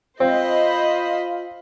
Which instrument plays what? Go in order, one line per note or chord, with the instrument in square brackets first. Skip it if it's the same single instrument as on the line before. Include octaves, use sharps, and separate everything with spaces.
[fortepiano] C4 [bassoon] F4 [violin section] C5 D#5 B5